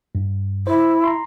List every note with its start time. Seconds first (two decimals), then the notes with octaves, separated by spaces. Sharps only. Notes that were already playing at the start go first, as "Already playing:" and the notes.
0.15 G2
0.67 E4 C5
1.04 A#5 C6